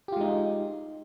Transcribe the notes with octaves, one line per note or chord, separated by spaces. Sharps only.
G#3 D#4 F4 G4